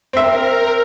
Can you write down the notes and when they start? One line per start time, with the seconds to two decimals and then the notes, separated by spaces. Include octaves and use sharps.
0.13 C4 A#4 E5